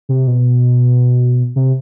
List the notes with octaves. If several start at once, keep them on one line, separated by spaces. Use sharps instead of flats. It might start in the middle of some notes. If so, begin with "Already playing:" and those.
C3
B2
C3